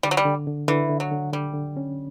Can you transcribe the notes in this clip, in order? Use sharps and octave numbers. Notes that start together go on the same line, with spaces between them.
D3 G3
F#3
G3
D3
D3
D3 E3
D3
F#3
D3
D3 G3
D3
C#4